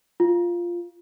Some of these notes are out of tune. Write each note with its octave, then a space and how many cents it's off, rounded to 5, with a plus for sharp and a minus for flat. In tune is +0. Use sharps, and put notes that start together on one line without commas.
F4 -5